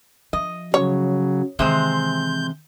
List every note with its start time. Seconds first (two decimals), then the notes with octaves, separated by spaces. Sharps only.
0.33 F3 D#5
0.74 C#3 F#3 C#5
1.59 C3 D#3 E3 G#3 C4 G6